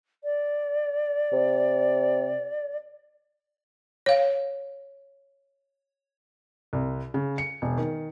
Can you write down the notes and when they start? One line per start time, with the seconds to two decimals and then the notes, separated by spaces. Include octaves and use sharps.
0.24 D5
1.33 C3
4.06 C#5 F5
6.73 C2
7.14 C#3
7.38 C#7
7.62 E1
7.77 D#3